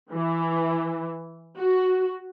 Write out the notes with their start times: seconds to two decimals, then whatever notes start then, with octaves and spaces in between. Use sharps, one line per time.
0.11 E3
1.58 F#4